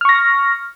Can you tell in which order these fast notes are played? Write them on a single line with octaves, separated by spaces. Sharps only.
F6 C#6 A#6